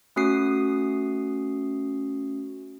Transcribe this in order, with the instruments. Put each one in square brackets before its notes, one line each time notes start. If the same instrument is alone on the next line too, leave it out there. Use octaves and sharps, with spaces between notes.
[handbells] A3 C#4 F#4 D#6 C7